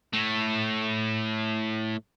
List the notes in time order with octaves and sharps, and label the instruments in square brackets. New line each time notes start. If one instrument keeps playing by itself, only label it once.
[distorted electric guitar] A2 A3